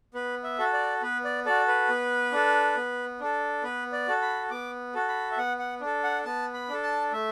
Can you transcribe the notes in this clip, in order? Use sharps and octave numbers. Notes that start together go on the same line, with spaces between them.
B3 B4
E5
F#4 A4
D5
B3 B4
D5
F#4 A4 D5
B4
B3
D4 A4
B3
D4 A4
B3 B4
D5
F#4 A4
B5
B3 D6
F#4 A4
B5
E5
B3 F#5
F#5
D4 A4
F#5
B3 A5
B5
D4 A4
A5
A3 E5